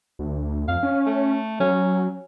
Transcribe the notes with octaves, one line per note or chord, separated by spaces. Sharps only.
D2
F2 F5
C#4
A3
F#3 C#4